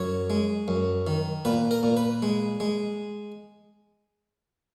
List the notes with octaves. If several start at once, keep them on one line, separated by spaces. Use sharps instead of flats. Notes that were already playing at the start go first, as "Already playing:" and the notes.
Already playing: F#2 C#5
G#3
F#2
D#3
A#2 B4
A#4
A#2
B4
G#3
G#3